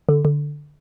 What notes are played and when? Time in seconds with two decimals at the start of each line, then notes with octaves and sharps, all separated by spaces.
0.09 D3
0.25 D3